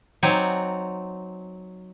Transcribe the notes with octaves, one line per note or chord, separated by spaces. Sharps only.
F#3 C4 D#4 D5 G#5